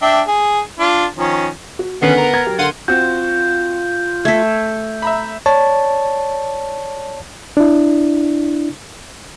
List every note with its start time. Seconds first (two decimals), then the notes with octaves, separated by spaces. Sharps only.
0.02 D4 E5 G5
0.28 G#4
0.79 D4 F4
1.18 D#3 F3 C#4
1.79 F#4
2.02 D3 D#3 B3 C#4 B4 C7
2.17 A#4
2.33 A#5 G#6 A6
2.46 F#3 G4
2.59 D3 A#4 F5 F#5 C6 D#7
2.88 C4 F4 F#4 G6
4.25 A3 A4 G#6 B6
5.02 E5 A#5 B5
5.46 C#5 D5 A5
7.57 D4 E4